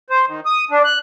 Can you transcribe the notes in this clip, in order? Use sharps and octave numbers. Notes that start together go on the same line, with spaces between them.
C5
D#3
D#6
D4
F#6